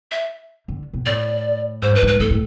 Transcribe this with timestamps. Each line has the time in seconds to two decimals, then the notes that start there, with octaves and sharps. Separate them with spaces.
0.11 E5
0.68 D3
0.93 B2
1.06 A2 D5
1.82 G#2 C5
1.92 G2 B4
2.03 G#2 B4
2.20 A2 A4
2.30 A2